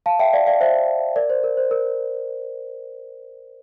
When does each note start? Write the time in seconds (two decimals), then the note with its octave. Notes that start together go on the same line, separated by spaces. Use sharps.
0.06 F5 A5
0.19 E5 G5
0.33 D5 F5
0.47 D5 F5
0.61 C5 E5
1.16 A#4 D5
1.30 C5
1.44 A#4
1.57 C5
1.71 A#4